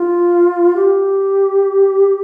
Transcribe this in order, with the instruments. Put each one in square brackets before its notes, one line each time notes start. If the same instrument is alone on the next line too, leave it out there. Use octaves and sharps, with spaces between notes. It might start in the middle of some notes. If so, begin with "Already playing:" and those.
Already playing: [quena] F4
G4